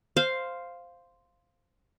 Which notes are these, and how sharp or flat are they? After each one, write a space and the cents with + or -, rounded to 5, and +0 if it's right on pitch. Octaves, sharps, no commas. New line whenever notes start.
C5 +0 F5 +0